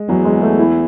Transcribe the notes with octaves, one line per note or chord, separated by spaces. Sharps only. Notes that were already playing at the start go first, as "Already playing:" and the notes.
Already playing: G#3
E2 F#3
G#3
A3
E4